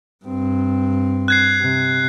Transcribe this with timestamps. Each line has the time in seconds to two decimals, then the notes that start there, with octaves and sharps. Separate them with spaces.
0.25 G2 C4
1.28 F#6 G#6 C7
1.61 C3